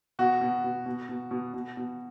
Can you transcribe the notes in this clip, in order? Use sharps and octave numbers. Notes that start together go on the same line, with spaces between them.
B2 F#4
B2
B2
B2
B2
B2
B2
B2